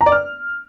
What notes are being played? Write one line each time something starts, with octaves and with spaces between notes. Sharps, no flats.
A#5
D5
F6